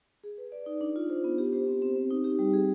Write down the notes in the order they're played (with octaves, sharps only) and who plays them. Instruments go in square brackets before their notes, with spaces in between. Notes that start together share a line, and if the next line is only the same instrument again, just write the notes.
[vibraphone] G#4
B4
D5
D#4
D4
F4
C5
B3
G4
C5
C4
C4
C4
D#4
G4
G3
G#4